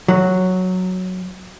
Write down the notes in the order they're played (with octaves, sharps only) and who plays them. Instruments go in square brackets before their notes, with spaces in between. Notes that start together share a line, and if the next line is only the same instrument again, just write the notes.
[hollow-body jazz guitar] F#3